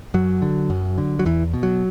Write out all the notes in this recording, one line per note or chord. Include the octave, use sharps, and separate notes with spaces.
F#2 F#3
D3
F#2
D3
F#3
E2 E3
B2
F#3